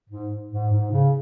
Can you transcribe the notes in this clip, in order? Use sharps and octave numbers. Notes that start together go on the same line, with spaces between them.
G#2
G#2
G#2
C#3